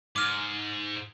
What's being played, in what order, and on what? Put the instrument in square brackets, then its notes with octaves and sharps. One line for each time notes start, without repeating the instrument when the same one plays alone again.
[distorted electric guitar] G#2 [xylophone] D6 F6